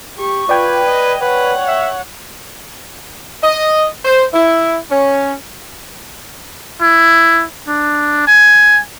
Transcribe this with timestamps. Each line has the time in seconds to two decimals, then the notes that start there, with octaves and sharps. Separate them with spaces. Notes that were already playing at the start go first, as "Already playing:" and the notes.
0.18 G4 C#6
0.49 F4 B4 D5 G5 G#6
0.86 D#5
1.22 B4 C#5 F#5
1.68 E5
3.43 D#5
4.05 C5
4.34 E4
4.90 C#4
6.81 E4
7.68 D4
8.27 G#5